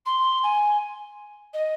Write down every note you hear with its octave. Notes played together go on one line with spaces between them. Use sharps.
C6
G#5
D#5